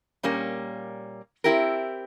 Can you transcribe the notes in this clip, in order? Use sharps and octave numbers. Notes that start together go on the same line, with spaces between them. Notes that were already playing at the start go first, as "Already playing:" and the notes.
A#2 G3 A#3 C#4
C4 E4 G4 A#4